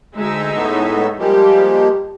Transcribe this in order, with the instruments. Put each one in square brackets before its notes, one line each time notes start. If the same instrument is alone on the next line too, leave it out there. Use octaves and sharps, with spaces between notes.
[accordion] D2 [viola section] G#3 D#4 E5
[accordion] A2 A3 B3
[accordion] F3 G#3 A#3 [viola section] G3 G4